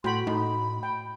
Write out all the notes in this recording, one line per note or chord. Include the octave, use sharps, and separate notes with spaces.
A2 F#4 G5 B5 C6
A2 D#4 B5
G5